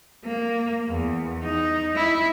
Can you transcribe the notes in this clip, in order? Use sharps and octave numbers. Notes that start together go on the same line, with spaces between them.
A#3
E2
D#4
E4